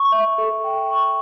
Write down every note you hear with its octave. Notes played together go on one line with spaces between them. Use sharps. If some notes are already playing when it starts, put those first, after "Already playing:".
Already playing: C#6
E5
A4
G5
C#6